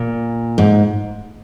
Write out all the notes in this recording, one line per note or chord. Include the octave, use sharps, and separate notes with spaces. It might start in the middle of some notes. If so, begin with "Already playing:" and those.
Already playing: A#2
G#2